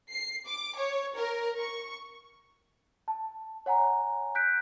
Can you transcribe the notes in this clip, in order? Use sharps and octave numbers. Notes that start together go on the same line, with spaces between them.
C7
D6
C#5
A#4
C#6
A5
C#5 F#5 G#5 A#5
F#6 G6 B6 D7